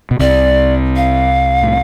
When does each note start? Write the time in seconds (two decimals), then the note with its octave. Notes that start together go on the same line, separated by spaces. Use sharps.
0.11 B2
0.19 C2 C3 D5
0.96 F5
1.63 A2